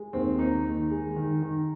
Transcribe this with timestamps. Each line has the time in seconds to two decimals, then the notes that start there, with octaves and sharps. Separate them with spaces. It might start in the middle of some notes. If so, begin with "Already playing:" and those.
Already playing: G#3
0.13 D#2 C4
0.39 D#2 D#4
0.65 D#3
0.90 G#3
1.16 D#3
1.42 D#3